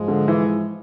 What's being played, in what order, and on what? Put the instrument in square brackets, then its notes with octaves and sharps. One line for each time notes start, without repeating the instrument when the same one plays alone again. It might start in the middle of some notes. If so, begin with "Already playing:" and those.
Already playing: [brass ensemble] G#2 F3 G#3
[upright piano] D3
E3